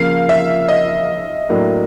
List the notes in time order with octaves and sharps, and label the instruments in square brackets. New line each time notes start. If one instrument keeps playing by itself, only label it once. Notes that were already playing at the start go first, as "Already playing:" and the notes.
Already playing: [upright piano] C#3 F3 A#3 [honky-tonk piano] F5
[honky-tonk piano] E5
D#5
[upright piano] A2 F#3 A#3 D4